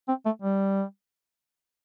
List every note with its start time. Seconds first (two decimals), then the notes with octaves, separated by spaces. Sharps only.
0.08 C4
0.25 A3
0.42 G3